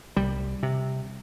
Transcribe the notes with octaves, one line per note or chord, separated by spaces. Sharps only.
C2 G3
C3